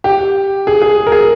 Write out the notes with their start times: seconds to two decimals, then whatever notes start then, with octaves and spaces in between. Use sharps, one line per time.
0.04 G4
0.67 G#4
0.82 G#4
1.07 A#4
1.12 G#4